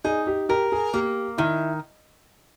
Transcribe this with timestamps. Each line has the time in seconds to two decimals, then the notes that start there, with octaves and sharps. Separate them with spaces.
0.05 D#4 G#4
0.27 G4
0.49 G4 A#4
0.72 G#4
0.94 A#3 G4
1.38 D#3 E4